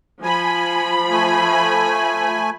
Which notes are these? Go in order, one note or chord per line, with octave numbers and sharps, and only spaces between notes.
F3 G#5 B5
A3 G#5